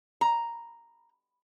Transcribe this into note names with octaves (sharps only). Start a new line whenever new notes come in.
A#5